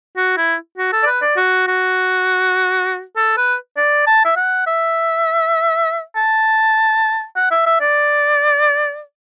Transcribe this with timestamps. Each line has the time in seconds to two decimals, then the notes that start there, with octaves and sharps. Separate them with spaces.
0.17 F#4
0.37 E4
0.78 F#4
0.93 A4
1.03 D5
1.07 B4
1.22 D5
1.36 F#4
1.67 F#4
3.16 A4
3.37 B4
3.77 D5
4.07 A5
4.25 E5
4.36 F#5
4.67 E5
6.16 A5
7.36 F#5
7.51 E5
7.66 E5
7.80 D5